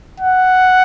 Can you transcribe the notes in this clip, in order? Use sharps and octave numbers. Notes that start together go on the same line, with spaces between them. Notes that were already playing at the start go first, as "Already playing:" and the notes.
F#5